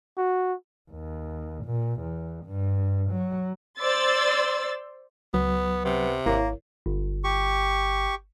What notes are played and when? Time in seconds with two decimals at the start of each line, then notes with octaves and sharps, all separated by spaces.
0.17 F#4
0.91 D#2
1.65 A#2
2.01 E2
2.46 G2
3.11 F#3
3.79 C5 D5 C6 E6 A6
5.34 C#2 F#3 B3
5.85 C3 B3
6.26 G#1 A#3 E4 A#4 C#5
6.86 G1
7.24 G4 C#6